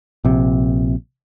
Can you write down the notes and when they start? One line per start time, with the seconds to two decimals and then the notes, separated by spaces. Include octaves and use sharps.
0.25 A#1 C3